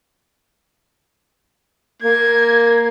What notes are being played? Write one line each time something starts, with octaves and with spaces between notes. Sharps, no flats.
A#3 G#6